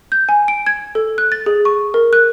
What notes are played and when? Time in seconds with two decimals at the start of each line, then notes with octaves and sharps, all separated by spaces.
0.12 G6
0.29 G#5
0.48 D7
0.67 G#6
0.95 A4
1.18 F#6
1.32 A6
1.46 G#4
1.65 C#6
1.94 A#4
2.13 F#6